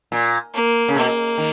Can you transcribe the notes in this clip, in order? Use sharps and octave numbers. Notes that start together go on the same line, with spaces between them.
A#2
A#3
C#3
B2 A#3
D#3